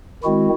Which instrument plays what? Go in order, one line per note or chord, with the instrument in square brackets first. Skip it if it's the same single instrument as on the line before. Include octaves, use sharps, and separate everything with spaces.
[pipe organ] D#3 G#3 C4 E4 F#4